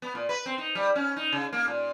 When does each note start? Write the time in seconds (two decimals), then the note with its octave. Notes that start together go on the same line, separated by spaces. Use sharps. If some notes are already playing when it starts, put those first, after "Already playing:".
0.02 B3
0.15 A#2
0.29 B4
0.46 C4
0.58 D#4
0.75 G3
0.96 C#4
1.16 D#4
1.32 C#3
1.53 A#3
1.68 A#2